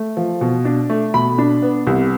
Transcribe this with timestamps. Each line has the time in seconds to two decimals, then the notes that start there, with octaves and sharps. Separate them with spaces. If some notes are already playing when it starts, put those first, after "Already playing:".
Already playing: A3
0.17 F3
0.41 B2
0.65 D4
0.90 A3
1.14 B2 B5
1.38 D4
1.62 B3
1.87 C2